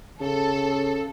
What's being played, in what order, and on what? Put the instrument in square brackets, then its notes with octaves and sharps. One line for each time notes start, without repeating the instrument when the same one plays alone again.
[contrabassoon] C#3 [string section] A4